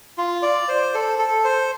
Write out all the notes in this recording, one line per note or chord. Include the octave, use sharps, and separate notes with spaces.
F4
D5
C5
A4
A4
C5